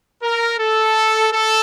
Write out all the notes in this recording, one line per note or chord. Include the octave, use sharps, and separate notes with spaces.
A#4
A4
A4